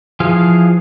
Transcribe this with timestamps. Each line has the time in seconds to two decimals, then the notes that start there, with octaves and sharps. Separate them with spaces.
0.20 E3 F3 G#4 F5